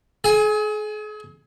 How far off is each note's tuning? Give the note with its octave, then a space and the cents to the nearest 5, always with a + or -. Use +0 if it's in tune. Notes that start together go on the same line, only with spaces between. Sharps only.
G#4 +40 G#5 +0